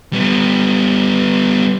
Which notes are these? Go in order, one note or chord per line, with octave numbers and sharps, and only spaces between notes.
G3 B3